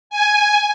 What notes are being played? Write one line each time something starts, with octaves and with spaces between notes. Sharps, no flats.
G#5